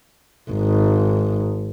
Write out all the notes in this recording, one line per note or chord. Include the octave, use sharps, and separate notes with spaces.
G#1